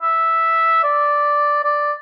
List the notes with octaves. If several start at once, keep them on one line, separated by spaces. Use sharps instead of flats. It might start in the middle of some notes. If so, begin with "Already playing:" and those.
E5
D5
D5